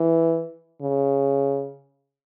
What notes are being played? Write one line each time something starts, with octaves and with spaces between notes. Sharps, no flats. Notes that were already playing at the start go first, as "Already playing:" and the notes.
Already playing: E3
C#3